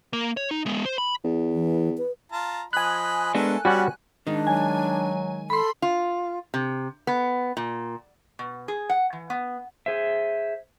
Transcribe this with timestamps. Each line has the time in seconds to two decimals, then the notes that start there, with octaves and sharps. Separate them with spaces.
0.13 A#3 A#4
0.37 C#5
0.51 D#4
0.66 G#3 B3
0.85 C5
0.98 B5
1.24 E2
1.52 E3
1.98 B4
2.32 F4 A5 A#5
2.73 F3 D#5 G#5 B5 F#6
3.35 G#3 A3 B3 D4 A4 A#4
3.65 G3 B3 C#4 F#4 D5 F#5
4.27 D#3 G#3 D4 D#4
4.47 F#3 G#5
5.50 A4 B5 C6
5.82 F4
6.54 C3
7.07 B3
7.57 A#2
8.39 B2
8.68 G#4
8.89 F#5
9.13 E3
9.30 B3
9.86 G#4 C5 E5